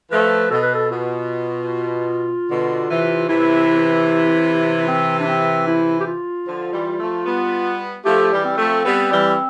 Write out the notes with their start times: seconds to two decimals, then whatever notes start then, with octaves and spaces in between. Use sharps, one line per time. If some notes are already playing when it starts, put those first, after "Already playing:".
0.11 F3 A3 B4
0.51 B2 A4
0.62 B4
0.74 A4
0.90 B2 F4
2.49 B2 D3
2.89 C3 E3
3.29 C3 E3 E4
4.88 C4
5.19 D4
5.28 C4
5.67 E4
6.00 G4
6.07 F4
6.46 D3 F3
6.73 E3 G3
7.00 F3 A3
7.26 G3 B3
8.05 F3 A3 G4
8.32 E3 G3
8.45 C4
8.58 F3 A3
8.84 G3 B3
9.11 E3 G3